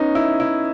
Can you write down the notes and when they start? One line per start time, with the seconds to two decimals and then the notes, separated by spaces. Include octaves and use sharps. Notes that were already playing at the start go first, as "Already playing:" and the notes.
Already playing: B3 C#4 D#4
0.15 E4
0.40 E4